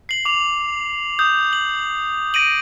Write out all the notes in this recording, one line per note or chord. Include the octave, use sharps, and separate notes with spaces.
C7 F#7
D6 F7
D#6 G6
F#7
A#6 D7 D#7 F#7